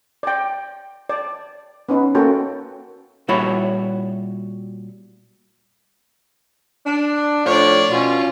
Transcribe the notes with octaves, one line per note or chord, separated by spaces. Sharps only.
D5 G5
D5
B3 C#4 D#4 B4
A#3 C#4 F#4 A4 G5
A#2 G3 E4 F#4 C#5 B5
D4
A2 F3 D4 C#5 D5
B2 C#4 F4